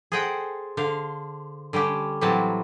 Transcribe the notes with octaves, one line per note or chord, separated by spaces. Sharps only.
G#4 A4 C5 D#5 F#5 G5
D3 C5 F5
D3 G3 C#4 G4
A2 E3 F#3 G3 C4 A5